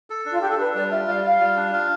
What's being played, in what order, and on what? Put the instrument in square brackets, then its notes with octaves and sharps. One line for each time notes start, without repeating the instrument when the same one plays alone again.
[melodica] A4
D4
[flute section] F4
[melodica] D4 [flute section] G4
[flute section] A4
[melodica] D4 [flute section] B4
[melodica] G3 [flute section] D5
[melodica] F4 [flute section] E5
[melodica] G3 [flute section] F5
[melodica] F4 [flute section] F5
[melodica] G3
D4
F4